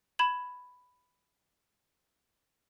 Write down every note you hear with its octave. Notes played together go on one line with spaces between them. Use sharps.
B5 G#6 E7 F#7